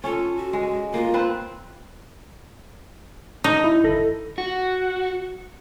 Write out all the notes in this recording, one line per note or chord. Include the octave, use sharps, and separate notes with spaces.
C#4 F4 A4
F#4
G#3
A#3 F4
C4 B4
D#4
E4
G1 A4 A#6
F#4